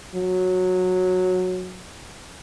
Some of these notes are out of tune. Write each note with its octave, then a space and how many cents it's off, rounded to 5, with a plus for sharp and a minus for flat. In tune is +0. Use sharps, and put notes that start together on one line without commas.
F#3 -15